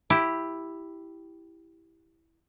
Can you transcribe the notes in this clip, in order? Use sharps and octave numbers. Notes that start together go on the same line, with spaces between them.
E4 G4